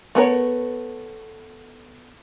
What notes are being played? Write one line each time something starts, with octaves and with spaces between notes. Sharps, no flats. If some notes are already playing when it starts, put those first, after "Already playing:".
A3 B3 A#4 C#5